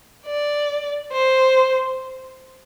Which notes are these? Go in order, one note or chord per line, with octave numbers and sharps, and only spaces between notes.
D5
C5